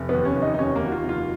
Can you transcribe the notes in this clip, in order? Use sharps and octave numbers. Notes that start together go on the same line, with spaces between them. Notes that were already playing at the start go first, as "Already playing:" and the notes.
Already playing: F1
B3
D#2
C#4
F1
D#4
D#4
D#2 C#4
A#3
D#2 F#4
F4
F1
F4